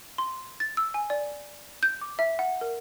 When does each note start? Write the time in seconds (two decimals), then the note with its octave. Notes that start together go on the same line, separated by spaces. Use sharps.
0.18 C6
0.60 A6
0.77 E6
0.94 G#5
1.10 D5
1.83 G6
2.01 D6
2.19 E5
2.39 F#5
2.61 A#4